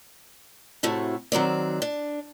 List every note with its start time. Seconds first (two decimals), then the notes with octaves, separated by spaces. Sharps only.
0.83 A2 C3 A3 F#4
1.32 D#3 F#3 C4 D5
1.82 D4